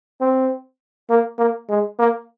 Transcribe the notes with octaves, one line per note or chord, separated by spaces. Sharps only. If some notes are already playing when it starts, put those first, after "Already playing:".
C4
A#3
A#3
G#3
A#3